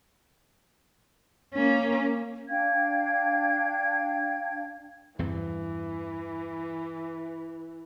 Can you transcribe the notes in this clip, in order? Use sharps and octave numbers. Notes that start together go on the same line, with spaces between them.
A#3 C#4
D4 F5 G5 G#6
E2 G2 E3 C4